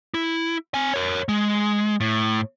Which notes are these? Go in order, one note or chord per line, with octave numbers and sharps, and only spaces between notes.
E4
C4 G#5
A#4 C#5
G#3
A2